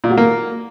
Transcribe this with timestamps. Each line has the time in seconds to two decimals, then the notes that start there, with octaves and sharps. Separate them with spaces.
0.04 A#2
0.11 F#3
0.18 A#3